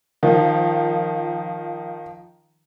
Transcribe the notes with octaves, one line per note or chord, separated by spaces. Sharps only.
D#3 F3